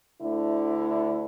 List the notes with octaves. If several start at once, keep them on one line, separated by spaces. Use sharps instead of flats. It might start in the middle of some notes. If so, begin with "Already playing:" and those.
D2 D3 A3 E4